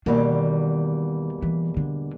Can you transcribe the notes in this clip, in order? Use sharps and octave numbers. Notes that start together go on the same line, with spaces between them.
E2 B2 D#3 G3 A#3
E3
D3